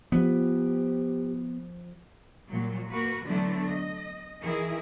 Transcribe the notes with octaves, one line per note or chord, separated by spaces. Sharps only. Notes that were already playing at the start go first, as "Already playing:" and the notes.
F3 B3 G4
A#2 F#3 G3
A#3 F#4 B4
D3 F#3 A3 B3 D4 E4
D#5
D#3 E3 E4 G#4 A#4